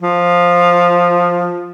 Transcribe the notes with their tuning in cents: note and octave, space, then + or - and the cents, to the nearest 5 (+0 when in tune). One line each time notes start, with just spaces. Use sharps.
F3 +5